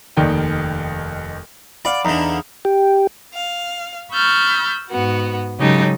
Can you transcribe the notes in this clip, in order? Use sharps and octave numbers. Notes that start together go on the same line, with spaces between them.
F1 D#2 D#3 D#4 D5 G5
D5 F5 F#5 B5
E2 D3 D#4
G4
F5
B5 C#6 E6 F6 G6 A6
G#2 B3 F#4
C#3 F#3 G#3 D#4 G4 A4